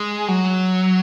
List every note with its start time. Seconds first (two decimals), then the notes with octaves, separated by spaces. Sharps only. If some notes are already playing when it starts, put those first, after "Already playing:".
Already playing: G#3
0.28 F#3